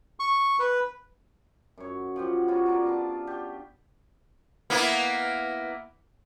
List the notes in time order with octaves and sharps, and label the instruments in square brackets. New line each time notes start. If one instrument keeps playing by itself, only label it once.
[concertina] C#6
B4
[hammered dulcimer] F#2 C#5
F3 G4 F#5
B3 F4 F#4 C#5
F4 A#4 D5
B3 D4 A5
G4
[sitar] A#3 B3 E4